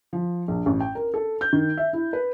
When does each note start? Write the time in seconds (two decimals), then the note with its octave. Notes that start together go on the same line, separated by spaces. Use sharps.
0.13 F3
0.48 A#1
0.66 A1
0.80 G5
0.95 A#4
1.14 A4
1.41 G6
1.53 D#3
1.77 E5
1.93 E4
2.13 B4